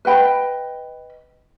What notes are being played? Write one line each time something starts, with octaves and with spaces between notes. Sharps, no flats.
B4 D#5 G5 B5